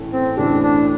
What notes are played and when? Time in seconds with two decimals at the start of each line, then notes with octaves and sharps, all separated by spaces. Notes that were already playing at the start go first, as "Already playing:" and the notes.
Already playing: A1 A2 E3 A3
0.12 C4
0.37 A1 A2 E3 A3 D4
0.63 D4